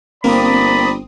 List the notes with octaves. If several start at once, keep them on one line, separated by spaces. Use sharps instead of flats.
G1 A#3 C4 D5 A#5 B5 D#6